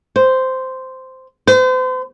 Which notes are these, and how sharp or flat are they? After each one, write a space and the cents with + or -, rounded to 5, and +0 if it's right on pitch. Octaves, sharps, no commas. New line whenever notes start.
C5 -10
C5 -40